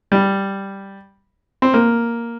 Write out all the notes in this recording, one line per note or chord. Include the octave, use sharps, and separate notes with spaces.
G3
C4
A#3